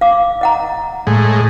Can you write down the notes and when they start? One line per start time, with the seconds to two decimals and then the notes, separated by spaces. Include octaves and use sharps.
0.01 F5 D6
0.41 D#5 F#5 A#5
1.07 A2 G#3